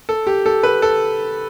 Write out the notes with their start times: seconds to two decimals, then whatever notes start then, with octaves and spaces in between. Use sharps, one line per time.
0.09 A4
0.27 G4
0.46 A4
0.63 B4
0.82 A4